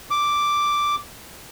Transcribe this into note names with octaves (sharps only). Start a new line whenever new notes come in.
D6